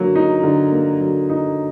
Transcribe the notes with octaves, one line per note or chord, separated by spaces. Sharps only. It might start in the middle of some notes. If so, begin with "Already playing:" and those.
Already playing: D3 F#3 A#3
D#4
D3
A#3
F#3
D#4